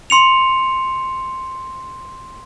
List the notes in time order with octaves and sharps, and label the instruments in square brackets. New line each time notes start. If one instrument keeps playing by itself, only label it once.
[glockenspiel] C6 C#7 F7